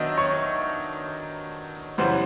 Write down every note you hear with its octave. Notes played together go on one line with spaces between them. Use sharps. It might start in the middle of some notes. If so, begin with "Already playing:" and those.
Already playing: D#3 F#3 B3 D4 D#5 E5 E6
C#5 C#6
F#2 C#3 E3 G3 B3 C5 C6